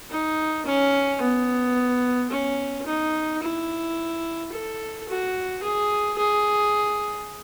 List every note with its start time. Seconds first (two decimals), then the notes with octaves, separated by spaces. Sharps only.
0.10 D#4
0.66 C#4
1.21 B3
2.31 C#4
2.87 D#4
3.42 E4
4.52 A4
5.09 F#4
5.63 G#4
6.18 G#4